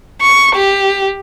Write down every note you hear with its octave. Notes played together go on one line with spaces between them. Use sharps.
C#6
G4